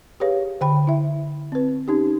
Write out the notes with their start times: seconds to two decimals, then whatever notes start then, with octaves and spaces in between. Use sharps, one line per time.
0.20 G4 G#4 B4 C#5 F5
0.61 D3 G5 B5
0.87 E4 E5
1.52 C4 B4
1.88 C#4 D#4 G4